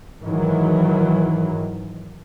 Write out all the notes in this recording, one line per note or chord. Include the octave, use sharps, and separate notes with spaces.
G#2 D#3 E3 F#3